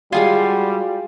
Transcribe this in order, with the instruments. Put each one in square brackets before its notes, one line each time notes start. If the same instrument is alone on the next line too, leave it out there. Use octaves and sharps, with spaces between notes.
[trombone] G3 [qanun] G#3 G#4 G#5 [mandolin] F4 [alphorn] F#4